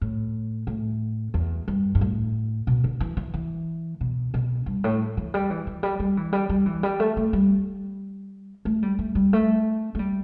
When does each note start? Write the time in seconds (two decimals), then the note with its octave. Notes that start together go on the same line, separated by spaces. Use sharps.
0.01 A2
0.67 A2
1.34 E2
1.68 G2
1.95 G2
2.01 A2
2.67 B2
2.84 D3
3.00 E3
3.17 E3
3.34 E3
4.01 B2
4.34 B2
4.66 G2
4.84 A2
5.17 E3
5.34 G3
5.50 E3
5.67 E3
5.83 G3
6.00 G3
6.17 E3
6.33 G3
6.49 G3
6.66 E3
6.83 G3
7.00 A3
7.17 A3
7.33 G3
8.65 A3
8.83 G3
8.99 A3
9.15 G3
9.33 A3
9.95 A3
9.99 G3